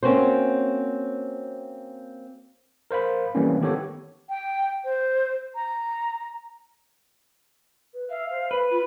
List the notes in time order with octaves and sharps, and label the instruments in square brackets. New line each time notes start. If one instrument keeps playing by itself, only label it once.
[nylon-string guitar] A#3 C4 C#4 F#4 C5
[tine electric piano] A#4 C5 F5 B5
E3 G3 A3 A#3 C4 C#4
D#3 B3 G4 A4 C#5
[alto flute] G5
C5
A#5
[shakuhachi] B4
[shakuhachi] E5 [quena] F5
[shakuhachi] C5
[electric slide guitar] B4
[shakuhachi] F4 [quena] B5